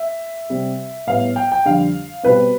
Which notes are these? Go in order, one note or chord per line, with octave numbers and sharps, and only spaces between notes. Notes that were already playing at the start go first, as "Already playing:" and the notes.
Already playing: E5
C3 G3 C4
A2 G3 B3 F5
G5
G5
F2 D3 G3 F5
B2 G3 C4 B4